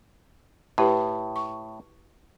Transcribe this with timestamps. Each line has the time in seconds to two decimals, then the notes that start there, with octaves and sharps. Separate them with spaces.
0.78 A2 E4 G4 B4
1.36 C#6